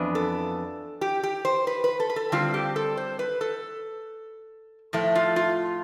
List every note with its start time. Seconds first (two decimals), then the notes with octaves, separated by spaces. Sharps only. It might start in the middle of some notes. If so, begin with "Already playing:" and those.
Already playing: F2 E3 B3 D4
0.15 A4
1.01 G4
1.23 G4
1.45 C5
1.67 B4
1.84 B4
2.00 A4
2.10 B4
2.16 A4
2.32 D3 G3 C4 F4
2.54 G4
2.76 A4
2.97 C5
3.19 B4
3.41 A4
4.93 A2 F3 A3
5.15 F4
5.36 F4